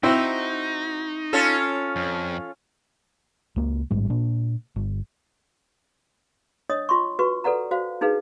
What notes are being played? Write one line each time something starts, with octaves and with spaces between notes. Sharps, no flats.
C4 D#4 E4 F#4 C5
C#4 F4 A4
F2
C#2 A#3
A1 G#2 G3
A#2 D4
G1
D4 C#5 D#5 D#6
F4 C6 C#6
F#4 B4 C#6
A4 B4 D5 F#5 A#5
F#4 C5 F5
D4 D#4 G#4 B4 F5